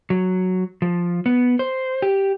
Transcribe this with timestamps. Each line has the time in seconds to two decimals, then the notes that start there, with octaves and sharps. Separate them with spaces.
0.10 F#3
0.82 F3
1.26 B3
1.59 C5
2.02 G4